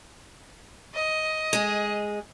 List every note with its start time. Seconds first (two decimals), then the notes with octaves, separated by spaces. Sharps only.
0.94 D#5
1.53 G#3 G#4